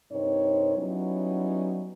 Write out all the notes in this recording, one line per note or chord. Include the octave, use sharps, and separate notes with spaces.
G2 C3 C4 D#4 A#4 C#5
F#3 G3 B3 C#4 D#4 E4